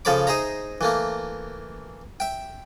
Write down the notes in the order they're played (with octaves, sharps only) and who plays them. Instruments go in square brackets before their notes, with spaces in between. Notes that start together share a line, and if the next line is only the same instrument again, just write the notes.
[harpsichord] C#3 F3 A4 C#5 B5 D6
D#4 G#4 C5 E5 A#5
E3 A3 A#3
E5 G5